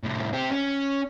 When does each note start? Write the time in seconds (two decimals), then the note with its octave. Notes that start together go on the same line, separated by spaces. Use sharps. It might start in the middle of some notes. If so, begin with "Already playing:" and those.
0.04 C2 A2
0.33 C4 G4
0.51 C#4